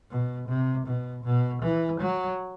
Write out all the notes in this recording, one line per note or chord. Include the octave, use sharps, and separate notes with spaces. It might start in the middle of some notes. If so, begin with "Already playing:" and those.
B2
C3
B2
B2
E3
F#3